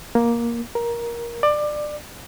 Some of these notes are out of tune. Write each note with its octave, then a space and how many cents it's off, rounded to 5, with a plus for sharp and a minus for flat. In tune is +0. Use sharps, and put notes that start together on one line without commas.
A#3 +10
A#4 +15
D5 +20